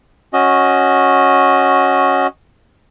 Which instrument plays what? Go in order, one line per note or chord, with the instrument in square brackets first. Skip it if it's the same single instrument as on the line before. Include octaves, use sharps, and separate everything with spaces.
[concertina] C#4 F#4 D#5